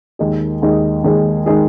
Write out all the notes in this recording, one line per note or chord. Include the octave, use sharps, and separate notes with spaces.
D#2 D#3 G#3 D#4 G#4
D#2 D#3 G#3 D#4 G#4
D#2 D#3 G#3 D#4 G#4
D#3 G#3 D#4 G#4